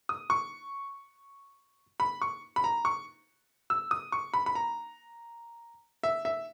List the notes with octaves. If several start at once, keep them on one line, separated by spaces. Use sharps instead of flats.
D#6
C#6
B5
C#6
B5
A#5
C#6
E6
D#6
C#6
B5
B5
A#5
E5
E5